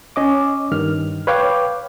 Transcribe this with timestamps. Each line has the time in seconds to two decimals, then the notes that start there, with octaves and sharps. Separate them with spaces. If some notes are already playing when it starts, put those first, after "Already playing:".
0.16 C#4 D#5 D6
0.72 G2 D#3 F6
1.27 B4 C#5 F5 G5 D6